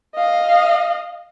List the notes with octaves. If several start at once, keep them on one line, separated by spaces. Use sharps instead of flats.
D#5 F5